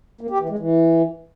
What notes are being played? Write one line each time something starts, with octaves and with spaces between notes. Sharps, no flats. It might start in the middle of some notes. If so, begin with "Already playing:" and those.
A#3
G4
E3
G#3
E3